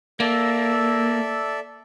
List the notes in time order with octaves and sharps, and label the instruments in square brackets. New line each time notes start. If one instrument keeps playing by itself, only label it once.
[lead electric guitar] A#3 [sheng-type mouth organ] A4 D5 E5